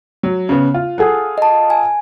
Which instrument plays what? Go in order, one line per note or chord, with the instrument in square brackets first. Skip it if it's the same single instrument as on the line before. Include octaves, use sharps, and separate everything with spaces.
[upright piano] F#3
C#3 B3
F4
[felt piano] G#4 A4 F#5
[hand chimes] D#5 A5
G#5